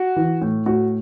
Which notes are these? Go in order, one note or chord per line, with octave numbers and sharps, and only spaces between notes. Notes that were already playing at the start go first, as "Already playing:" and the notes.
Already playing: F#4
E3
A2
A2 F#4